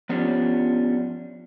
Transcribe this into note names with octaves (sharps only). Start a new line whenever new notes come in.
F3 B3 C#4 D4 F4 G4